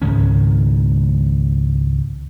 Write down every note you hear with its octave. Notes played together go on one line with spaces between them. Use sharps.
C#2 G#2 D#3 C#4